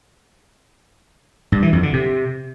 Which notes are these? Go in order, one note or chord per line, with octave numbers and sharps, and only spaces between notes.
G2
E3
F2
D3
C3